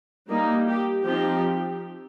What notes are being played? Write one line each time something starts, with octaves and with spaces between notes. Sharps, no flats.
G3 A#3 D#4
G4
F3 C4 D#4 G4